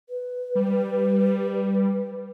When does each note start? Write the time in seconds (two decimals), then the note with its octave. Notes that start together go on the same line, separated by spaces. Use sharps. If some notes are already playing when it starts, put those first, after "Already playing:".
0.09 B4
0.55 G3